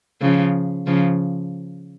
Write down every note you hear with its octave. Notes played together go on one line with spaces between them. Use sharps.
C#3 F3
C#3 F3